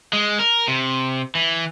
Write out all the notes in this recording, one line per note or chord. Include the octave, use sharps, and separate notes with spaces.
G#3
A#4
C3
E3